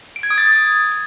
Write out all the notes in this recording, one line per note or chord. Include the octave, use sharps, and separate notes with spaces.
D7
G#6
D#6
A6